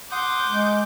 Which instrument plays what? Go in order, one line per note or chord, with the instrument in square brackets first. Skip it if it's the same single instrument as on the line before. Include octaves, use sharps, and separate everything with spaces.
[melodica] F#5 C6 D#6 [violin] D6 G6
[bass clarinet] G#3